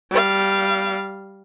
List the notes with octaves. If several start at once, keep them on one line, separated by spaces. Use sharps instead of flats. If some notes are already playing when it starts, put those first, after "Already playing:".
G3 F5